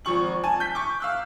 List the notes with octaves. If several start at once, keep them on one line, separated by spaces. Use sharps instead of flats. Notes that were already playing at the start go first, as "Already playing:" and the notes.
G#1 F3 C#6 F#7
G#5 A5
G6 B6
C#6 D6
F5 E6 F#6